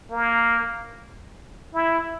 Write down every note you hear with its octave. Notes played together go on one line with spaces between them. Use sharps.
A#3
E4